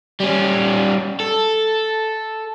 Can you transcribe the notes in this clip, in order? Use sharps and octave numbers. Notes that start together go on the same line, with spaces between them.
G3 C#4
A4